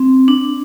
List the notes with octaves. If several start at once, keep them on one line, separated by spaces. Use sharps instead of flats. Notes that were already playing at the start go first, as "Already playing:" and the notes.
Already playing: C4
D4